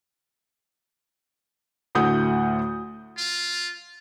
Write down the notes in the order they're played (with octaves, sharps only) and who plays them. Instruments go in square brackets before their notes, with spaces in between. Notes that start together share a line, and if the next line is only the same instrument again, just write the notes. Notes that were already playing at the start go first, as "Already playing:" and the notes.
[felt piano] D2 A2 A3 F#5 D#6 G6
[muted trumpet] F4